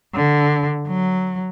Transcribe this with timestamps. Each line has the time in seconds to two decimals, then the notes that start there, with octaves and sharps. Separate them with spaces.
0.14 D3
0.87 F#3